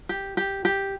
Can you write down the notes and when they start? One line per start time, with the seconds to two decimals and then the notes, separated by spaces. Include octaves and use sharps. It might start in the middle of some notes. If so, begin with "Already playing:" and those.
0.09 G4
0.37 G4
0.65 G4